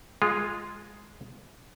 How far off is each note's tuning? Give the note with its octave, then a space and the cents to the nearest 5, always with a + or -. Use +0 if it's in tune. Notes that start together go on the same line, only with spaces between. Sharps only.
G#3 +0 F4 +0